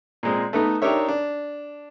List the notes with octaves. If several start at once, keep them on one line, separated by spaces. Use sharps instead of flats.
A#2 G#3 C4
A3 B3 D#4
D4 D#4 G4 A#4 C#5 E5
D4